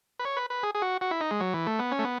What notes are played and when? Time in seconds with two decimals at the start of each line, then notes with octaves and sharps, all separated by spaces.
0.19 B4
0.25 C#5
0.37 B4
0.50 B4
0.63 G#4
0.75 G#4
0.82 F#4
1.01 F#4
1.11 E4
1.21 D#4
1.31 G#3
1.40 F#3
1.54 E3
1.67 A3
1.79 B3
1.92 C#4
1.99 A3
2.05 B3